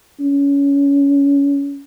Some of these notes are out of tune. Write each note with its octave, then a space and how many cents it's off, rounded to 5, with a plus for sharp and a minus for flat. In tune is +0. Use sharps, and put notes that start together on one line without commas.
C#4 +20